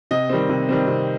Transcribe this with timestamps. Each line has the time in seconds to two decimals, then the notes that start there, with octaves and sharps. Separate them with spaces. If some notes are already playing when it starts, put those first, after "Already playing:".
0.11 C3 D#5
0.29 D#3 G3 C4
0.49 C3
0.69 D#3 G3 C4
0.87 C3